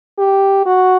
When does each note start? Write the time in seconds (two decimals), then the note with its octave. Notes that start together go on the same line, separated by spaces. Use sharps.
0.18 G4
0.66 F#4